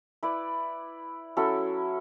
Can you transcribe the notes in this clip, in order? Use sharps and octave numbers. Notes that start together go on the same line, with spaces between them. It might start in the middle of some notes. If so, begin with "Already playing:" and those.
E4 B4 D5
F#3 C#4 E4 A4